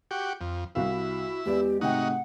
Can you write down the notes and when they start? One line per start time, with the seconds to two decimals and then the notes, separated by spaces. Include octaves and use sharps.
0.11 F#4 G4
0.41 F2
0.75 C2 E4 F#4 F5
1.46 E2 G#3 G4 D5
1.81 G#2 C3 A3 D#4 F#4 F#5 G5